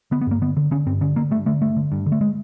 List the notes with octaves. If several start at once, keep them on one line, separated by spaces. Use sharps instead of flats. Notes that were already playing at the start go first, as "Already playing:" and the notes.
D3 B3
B3
G2 A#3
D3 B3
D3
D3 C#4
G2 C4
D3 C#4
D3 A#3
G2 A3
D3 A3
G2 A3
D3
G2
D3
A3
G#3